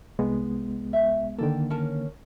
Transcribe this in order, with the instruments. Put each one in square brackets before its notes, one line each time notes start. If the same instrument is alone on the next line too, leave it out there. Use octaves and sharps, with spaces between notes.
[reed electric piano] C2 G#3 B3
[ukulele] E5
[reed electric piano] D3 D#3 A#3 [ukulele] A4 G5
[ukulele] C#4 A#4 A5